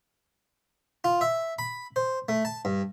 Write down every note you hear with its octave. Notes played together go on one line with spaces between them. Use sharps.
F4
E5
B5
C5
A3
A5
G2